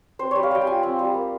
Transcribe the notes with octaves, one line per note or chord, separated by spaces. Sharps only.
C4 C5
G3 C#5
F5
G3 G5
G5
F4 G#5
C4
G3
A#3